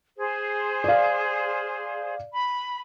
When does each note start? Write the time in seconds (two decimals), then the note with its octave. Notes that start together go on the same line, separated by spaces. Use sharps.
0.17 G#4 C5
0.84 D5 F5
2.34 B5